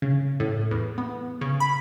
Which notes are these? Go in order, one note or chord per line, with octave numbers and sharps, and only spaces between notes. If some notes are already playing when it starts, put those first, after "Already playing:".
C#3
A2
E2
B3
C#3
B5